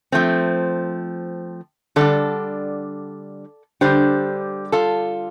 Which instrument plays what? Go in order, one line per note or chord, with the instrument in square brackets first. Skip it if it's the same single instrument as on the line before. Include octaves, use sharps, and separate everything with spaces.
[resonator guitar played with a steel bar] F3 A3 C4
D3 G3 D4 A4 D5
D3 G3 D4 G4 C5
F4 A4